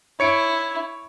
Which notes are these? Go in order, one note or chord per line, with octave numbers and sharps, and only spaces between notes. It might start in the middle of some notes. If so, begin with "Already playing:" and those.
E4 C#5 C#7 D7